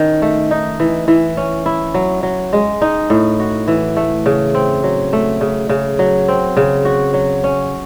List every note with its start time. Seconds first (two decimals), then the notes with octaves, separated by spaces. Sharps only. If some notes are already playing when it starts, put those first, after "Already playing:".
Already playing: D#3 C#4
0.22 A3
0.51 D#4
0.80 E3
1.08 E3
1.37 C#4
1.66 E4
1.94 F#3
2.23 F#3
2.53 G#3
2.82 D#4
3.10 A2
3.40 F#4
3.68 E3
3.97 A3
4.26 C#3
4.55 C4
4.84 F#3
5.13 A3
5.41 C#3
5.69 C#3
5.99 F#3
6.28 C4
6.57 C#3
6.85 F#4
7.14 F#3
7.44 C#4